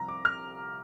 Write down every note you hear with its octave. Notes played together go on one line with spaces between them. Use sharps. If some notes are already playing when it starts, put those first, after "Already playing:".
Already playing: C2 C3 F3 A#5
D6
F6